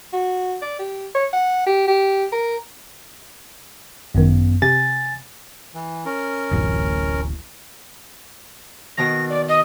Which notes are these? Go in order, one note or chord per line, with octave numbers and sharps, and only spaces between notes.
F#4
D5
G4
C#5
F#5
G4
G4
A#4
G#1 F#2 D#3 B3
C3 G#5 A6
E3
C#4 A#4
D1 A1
B2 D#3 A#6
D5
D#5